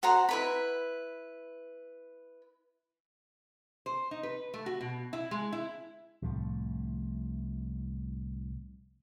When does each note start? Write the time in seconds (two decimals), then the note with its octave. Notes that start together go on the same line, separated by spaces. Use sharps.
0.03 F#4 C5 F#5 A#5
0.29 E4 B4 B5
3.86 C5
4.11 D#4
4.23 B4
4.54 A3
4.66 F#4
4.81 B2
5.13 E4
5.31 G#3
5.52 E4
6.22 C2 A2 F3 A3